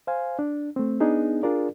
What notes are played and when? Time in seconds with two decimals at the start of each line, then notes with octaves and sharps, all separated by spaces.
0.07 C5 F5 G#5
0.39 D4
0.76 A3 C4
1.00 B3 D4 D#4 G#4
1.43 D4 F4 G#4 A#4 D5